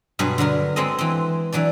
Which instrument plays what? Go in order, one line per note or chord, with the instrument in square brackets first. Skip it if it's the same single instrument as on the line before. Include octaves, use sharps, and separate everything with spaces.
[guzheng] G2 B2 F#3 G#3 B4 D#5
D3 F#3 B3 A#4
F#3 G#3 C4 A4 D#5
E3 C4
E3 F#3 D4 D5